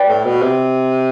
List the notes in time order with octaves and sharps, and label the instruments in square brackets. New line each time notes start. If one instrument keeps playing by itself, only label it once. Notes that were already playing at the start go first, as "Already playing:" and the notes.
Already playing: [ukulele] B4 D5 G5
[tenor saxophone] A2
B2
C3